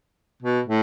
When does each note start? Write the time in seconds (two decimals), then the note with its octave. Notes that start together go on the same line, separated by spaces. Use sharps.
0.43 B2
0.68 A2